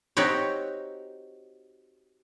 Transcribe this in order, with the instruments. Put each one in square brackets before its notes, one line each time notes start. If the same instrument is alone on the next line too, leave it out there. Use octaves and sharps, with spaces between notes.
[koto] C4 D#4 F#4 G4 C#5